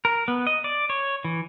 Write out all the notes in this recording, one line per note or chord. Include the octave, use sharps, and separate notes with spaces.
A#4
B3
D#5
D5
C#5
E3